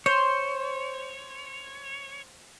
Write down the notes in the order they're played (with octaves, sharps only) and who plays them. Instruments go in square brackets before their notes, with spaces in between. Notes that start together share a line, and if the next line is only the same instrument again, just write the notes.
[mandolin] C5 [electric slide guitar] C#5